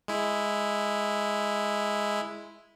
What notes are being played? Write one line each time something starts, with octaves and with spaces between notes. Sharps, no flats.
G#3 E4